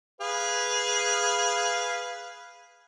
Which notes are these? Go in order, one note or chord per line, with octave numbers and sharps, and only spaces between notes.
G#4 B4 F5